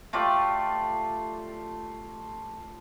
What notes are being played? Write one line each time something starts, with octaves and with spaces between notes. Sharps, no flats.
A3 F4 G4 D5